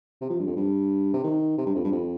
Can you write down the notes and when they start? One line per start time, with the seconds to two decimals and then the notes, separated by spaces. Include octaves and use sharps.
0.21 C3
0.30 F3
0.39 G2
0.47 F2
0.56 G2
1.14 C3
1.24 D#3
1.58 C3
1.66 G2
1.76 F2
1.84 G2
1.92 F2